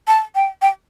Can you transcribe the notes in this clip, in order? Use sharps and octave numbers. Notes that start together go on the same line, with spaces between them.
A5
G5
G5